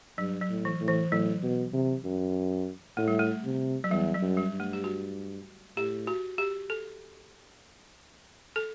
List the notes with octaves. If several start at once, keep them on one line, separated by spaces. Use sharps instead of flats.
G2 F#3
F#3
A2
E3
A2
E3
A2 F#3
B2
C3
F#2
A2 A3
G3
A3
C3
F#3
E2 G3
F#3
F#2
G3
G2
A3
G4
F#4
A2 G4
F#4
G4
A4
A4